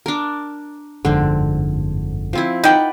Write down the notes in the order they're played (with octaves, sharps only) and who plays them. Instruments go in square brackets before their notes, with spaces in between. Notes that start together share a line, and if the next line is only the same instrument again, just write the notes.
[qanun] D4 A#4
[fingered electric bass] G1 F2 G#2 [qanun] D3 C4
[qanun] F3 C4 E4
[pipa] D#4 G5 [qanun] B4 D5 F#5